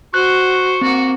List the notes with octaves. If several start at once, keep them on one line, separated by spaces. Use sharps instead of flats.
F#4 C5 C#6 F#6
A#3 C4 F#4